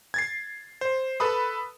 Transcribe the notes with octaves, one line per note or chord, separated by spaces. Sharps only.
G#6 A6 C7
C5
A4 B4 B5 D#6